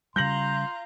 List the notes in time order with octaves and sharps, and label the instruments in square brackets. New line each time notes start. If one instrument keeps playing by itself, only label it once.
[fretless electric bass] C#3 G3 [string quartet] F4 A#5 [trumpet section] C6 [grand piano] G6 A#6 F#7